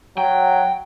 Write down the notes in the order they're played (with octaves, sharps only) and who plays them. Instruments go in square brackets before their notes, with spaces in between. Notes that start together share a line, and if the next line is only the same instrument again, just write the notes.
[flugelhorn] F#3 [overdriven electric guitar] G5